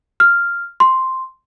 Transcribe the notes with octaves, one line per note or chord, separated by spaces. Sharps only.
F6
C6